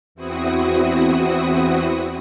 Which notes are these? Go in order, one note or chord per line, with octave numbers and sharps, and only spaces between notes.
E2 C4 E4 F#4 D#6